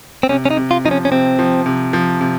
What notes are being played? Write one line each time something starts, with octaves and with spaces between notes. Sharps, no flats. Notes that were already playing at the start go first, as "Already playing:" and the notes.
C4
C3 C#4
C#4
D#4
C3
F4
F3 D#4
C#4
C#4
C3 C4
F3
C3
F3
C3